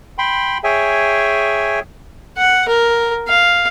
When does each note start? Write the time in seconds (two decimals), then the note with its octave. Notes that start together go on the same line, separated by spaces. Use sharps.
0.18 G5 B5 C6
0.64 G#4 C#5 E5 G5 G#5
2.38 F#5
2.68 A#4
3.28 F5